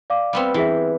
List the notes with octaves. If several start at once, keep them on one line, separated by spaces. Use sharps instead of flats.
D5 F5 D6
G3 B3 C4
E3 E4 G#4 E5